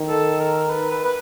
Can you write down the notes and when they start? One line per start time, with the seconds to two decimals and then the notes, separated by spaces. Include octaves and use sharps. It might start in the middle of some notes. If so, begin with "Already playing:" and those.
Already playing: D#3
0.09 A4
0.40 A#4
0.70 B4
0.91 B4
1.05 B4